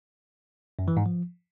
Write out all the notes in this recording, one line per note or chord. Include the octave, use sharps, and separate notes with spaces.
F#2
E3
G#2
F3